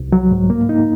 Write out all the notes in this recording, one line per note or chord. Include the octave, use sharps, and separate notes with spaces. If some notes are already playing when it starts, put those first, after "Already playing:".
Already playing: C2
F#3
G#2
A#3
D#4